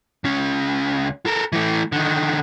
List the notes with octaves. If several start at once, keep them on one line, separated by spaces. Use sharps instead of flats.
C#2 C#4
A4 A#4
E3 A3
D3 D#3